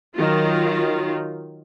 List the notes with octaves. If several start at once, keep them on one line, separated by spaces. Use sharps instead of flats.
D#3 F#3 F4